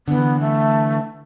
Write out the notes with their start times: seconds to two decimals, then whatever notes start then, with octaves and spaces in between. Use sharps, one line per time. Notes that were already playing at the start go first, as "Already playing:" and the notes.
0.08 D3 E3 B3
0.41 A3